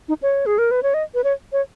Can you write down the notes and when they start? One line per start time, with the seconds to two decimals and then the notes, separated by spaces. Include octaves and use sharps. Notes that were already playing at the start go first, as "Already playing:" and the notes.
0.08 D#4
0.22 C#5
0.46 G#4
0.58 A#4
0.71 B4
0.83 C#5
0.94 D#5
1.14 B4
1.24 C#5
1.52 C#5